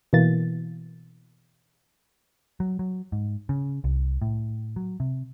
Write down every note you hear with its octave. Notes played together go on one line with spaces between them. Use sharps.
B2 E3 A#3 A6
F#3
F#3
G#2
C#3
C2
A2
F#3
C3